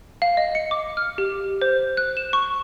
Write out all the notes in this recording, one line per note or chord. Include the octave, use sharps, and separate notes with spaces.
F5
D#5
C#7
D6
F6
G4
C5
F#6
E7
C#6